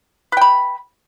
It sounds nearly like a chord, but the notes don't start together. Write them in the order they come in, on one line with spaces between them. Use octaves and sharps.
B4 G5 B5